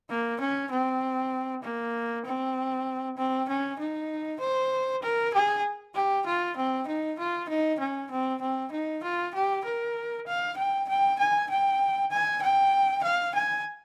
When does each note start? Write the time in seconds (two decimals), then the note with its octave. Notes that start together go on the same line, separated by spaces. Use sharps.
0.10 A#3
0.40 C#4
0.71 C4
1.63 A#3
2.25 C4
3.17 C4
3.49 C#4
3.79 D#4
4.40 C5
5.03 A#4
5.34 G#4
5.94 G4
6.26 F4
6.57 C4
6.87 D#4
7.19 F4
7.49 D#4
7.79 C#4
8.11 C4
8.41 C4
8.72 D#4
9.03 F4
9.35 G4
9.64 A#4
10.27 F5
10.57 G5
10.88 G5
11.19 G#5
11.50 G5
12.11 G#5
12.42 G5
13.03 F5
13.35 G#5